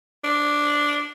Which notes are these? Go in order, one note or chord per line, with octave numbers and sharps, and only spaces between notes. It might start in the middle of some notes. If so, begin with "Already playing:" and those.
D4